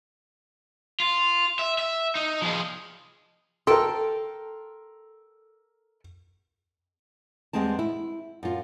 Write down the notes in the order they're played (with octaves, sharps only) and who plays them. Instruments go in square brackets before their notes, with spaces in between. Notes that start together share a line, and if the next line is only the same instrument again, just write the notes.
[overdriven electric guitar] F4
E5
E5
D#4
F3 G#4
[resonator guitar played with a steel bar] A4 G5 [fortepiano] A#4 C6
[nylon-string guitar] E2 G3 G#3 C4 A5
E4
F#2 F4